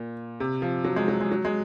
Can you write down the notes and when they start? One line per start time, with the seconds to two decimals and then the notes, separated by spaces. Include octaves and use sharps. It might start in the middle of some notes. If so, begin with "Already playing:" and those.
Already playing: A#2
0.40 C3
0.62 F3
0.85 F#3
0.96 G#3
1.08 F#3
1.21 G#3
1.32 F#3
1.45 G#3